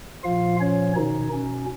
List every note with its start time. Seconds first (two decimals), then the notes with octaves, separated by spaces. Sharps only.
0.24 A#2 F3 F4 F5
0.60 C#4 C#5
0.96 B2 D#3 D#4
1.33 C#4